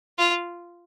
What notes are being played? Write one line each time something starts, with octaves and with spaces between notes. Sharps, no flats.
F4